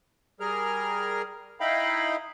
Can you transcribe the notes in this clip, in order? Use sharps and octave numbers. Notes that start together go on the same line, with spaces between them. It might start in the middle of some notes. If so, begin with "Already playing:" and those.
G3 G#4 A#4 F6
D#4 E4 D#5 F5 G5 B5